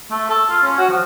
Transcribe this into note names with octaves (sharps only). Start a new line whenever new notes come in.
A3
A4
F4
C#4
F#4
F3